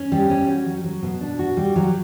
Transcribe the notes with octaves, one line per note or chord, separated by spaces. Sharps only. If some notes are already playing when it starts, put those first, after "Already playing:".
Already playing: C#4
G3
C#4
F#4
F#3
F#3
B2
D4
F#4
G3
F#3